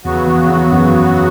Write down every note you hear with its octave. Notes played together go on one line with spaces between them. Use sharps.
E2 C#3 F#3 B3 F#4
E2
E2
F#2